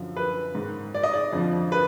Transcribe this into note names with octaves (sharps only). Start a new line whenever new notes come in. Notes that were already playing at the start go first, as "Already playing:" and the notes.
Already playing: F#2 D3 F3
B4
G#2 D#3
D5
D#5
D5
F2 D3 F3
B4